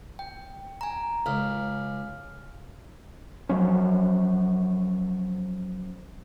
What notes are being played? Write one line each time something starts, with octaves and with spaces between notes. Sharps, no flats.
G5
G#5 A#5
C#2 F5 F6
F3 F#3 C#4